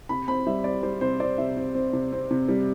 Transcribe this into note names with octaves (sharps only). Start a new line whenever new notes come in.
C3 B5
C4 B5
G3 E5
C4 D5
G3 C5
C3 C5
C4 D5
C3 E5
C4
C4
C3
C4
C3
G3